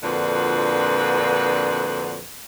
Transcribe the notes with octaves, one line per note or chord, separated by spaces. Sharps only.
F2 A#2 D3 D4 F#4 B4